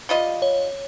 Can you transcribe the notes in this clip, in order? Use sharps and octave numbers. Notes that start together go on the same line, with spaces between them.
G3 F4 D#5
C#5